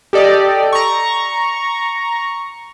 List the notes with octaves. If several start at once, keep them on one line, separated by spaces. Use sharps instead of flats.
G4 A4 D5 D#5
A#5 C#6